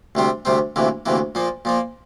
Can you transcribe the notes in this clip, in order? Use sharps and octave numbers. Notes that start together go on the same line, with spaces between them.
D2 C3 G3 C4
D2 C3 G3 C4
D2 C3 E3 A#3
D2 C3 E3 A#3
A#2 F3 A#3
A#2 F3 A#3